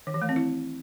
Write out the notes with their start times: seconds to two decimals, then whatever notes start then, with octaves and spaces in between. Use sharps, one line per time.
0.07 D#3
0.14 E3
0.22 A3
0.29 C4
0.36 E4